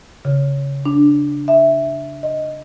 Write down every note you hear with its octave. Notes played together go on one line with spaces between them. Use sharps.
C#3
D4
E5
D#5